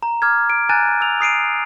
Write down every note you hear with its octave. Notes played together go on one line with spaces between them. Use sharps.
A#5
D6 F6 G#6
D7
G#5 A#5 F#6 A6 D#7
E6 F7
D#6 C7 D7 D#7